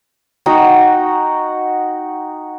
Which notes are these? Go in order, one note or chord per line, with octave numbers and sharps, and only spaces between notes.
D#4 F#4 F#5 G5